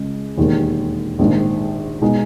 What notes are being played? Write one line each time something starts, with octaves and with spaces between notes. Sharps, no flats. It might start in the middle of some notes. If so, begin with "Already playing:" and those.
Already playing: C#2 C#3 G#3
E1 D#2 D#3
A#1 G#2 D#3
B2 G#3 D#4